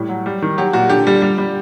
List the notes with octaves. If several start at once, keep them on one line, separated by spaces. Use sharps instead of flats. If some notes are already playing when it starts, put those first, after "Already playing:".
Already playing: A2 G3
F#3
G3
D#3
F#3 G4
A#2 F#4
D3 G4
G3
G3
G3